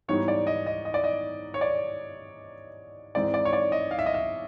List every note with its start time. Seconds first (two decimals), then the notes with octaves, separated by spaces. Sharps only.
0.08 G#2 E3 G3 B3 D#4 C#5
0.28 D5
0.47 D#5
0.66 D#5
0.85 D#5
0.94 D5
1.04 D#5
1.54 C#5
1.61 D5
3.15 G#2 E3 G#3 C4 D#4 D5
3.34 D5
3.45 C#5
3.53 D5
3.72 D#5
3.91 F5
3.99 E5
4.06 D#5
4.14 E5